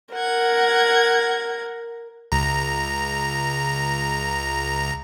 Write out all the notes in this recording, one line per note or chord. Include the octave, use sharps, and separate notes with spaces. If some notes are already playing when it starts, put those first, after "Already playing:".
A#4 F#5 G#6
C#2 A#5